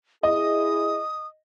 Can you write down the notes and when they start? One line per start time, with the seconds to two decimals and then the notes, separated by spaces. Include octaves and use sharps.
0.23 E4 G#4 D#5 D#6